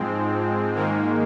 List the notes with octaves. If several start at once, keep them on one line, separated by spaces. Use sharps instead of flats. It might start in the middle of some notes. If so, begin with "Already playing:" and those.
Already playing: G#2 F3 G#3 C4
G#2 D#3 G#3 A#3